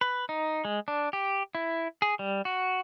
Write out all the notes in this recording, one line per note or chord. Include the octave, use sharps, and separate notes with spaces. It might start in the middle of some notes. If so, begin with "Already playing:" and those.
B4
D#4
G#3
D4
G4
E4
G#4
G3
F#4